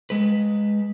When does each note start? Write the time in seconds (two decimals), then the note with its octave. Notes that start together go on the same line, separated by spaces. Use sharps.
0.10 G#3 B4